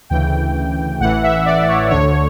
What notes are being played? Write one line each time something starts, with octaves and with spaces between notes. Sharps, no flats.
D2 C#3 E3 G5
A1 A2 E3 F#5
E5
D5
C#5
D2 D3 C#5